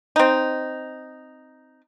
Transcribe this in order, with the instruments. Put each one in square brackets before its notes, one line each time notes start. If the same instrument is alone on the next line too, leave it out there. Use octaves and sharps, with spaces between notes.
[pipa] C4 D#4